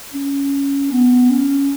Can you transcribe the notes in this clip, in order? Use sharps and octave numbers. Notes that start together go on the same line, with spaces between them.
C#4
B3
C#4